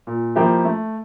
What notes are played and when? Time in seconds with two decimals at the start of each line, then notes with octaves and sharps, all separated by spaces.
0.07 A#2
0.36 F3 A#3 E4 G4
0.65 A3